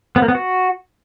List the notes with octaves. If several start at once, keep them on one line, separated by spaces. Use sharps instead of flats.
B3
A#3
B3
F#4